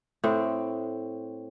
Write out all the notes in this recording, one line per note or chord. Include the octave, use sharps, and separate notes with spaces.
A2 C4